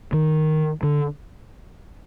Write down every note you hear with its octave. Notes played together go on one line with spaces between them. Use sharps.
D#3
D3